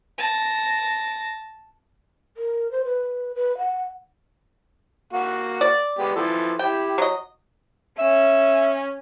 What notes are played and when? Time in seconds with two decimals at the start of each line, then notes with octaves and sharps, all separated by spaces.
0.18 A5 A#6
2.35 A#4
2.71 C5
2.84 B4
3.35 B4
3.58 F#5
5.13 A#3 F#4 F#5
5.61 D5
5.98 G#3 B3 G4
6.16 E3 F3 A4
6.59 E4 G4 G5
6.98 F#3 D#5
7.99 C#4 E5